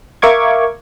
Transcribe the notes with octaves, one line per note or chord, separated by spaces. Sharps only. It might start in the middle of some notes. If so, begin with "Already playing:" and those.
A#4 E5 F5 C#6 D6 G#6